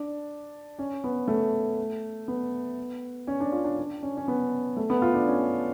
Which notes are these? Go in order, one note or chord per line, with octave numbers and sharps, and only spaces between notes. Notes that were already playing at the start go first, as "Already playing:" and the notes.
Already playing: D4
C#4
B3
A3
B3
C#4
D4
F4
D4
D4
C#4
C#4
B3
A3
B3
F4
D4
C#4